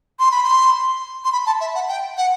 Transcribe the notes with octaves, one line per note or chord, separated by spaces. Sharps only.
C6
B5
C6
C6
B5
A5
E5
F#5
G5
F#5